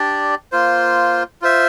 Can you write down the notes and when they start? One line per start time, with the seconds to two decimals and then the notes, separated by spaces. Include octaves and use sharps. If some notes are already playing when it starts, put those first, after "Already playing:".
Already playing: D4 G4 D5
0.52 A#3 F4 C5
1.42 F4 C5 E5